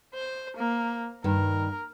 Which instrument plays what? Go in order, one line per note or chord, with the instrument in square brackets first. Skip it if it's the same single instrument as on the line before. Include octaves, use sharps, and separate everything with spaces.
[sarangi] C5
A#3
[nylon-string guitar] G2 D#3 [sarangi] A#4